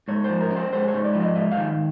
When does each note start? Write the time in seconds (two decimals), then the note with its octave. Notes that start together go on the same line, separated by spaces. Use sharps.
0.08 G#2 C#5
0.24 C5
0.30 F3
0.41 A#4
0.50 C#4
0.56 C5
0.73 G#3 C5
0.88 C#5
0.94 G#2
1.04 D5
1.15 F3
1.20 D#5
1.35 G#2 E5
1.52 F5
1.57 D#3